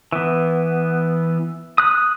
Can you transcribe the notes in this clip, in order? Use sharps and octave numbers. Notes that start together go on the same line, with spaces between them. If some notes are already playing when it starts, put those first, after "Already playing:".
E3 B3
D#6 F#6